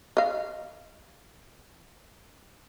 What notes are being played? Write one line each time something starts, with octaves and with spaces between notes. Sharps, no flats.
D#5 F5